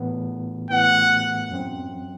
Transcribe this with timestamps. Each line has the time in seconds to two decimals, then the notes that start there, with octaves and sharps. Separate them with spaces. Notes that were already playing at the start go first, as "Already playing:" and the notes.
Already playing: A2 E3 B3
0.70 A2 E3 B3 F#5
1.50 F#2 F#3 C4